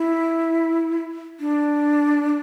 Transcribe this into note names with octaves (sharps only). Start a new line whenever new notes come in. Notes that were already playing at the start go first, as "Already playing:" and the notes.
Already playing: E4
D4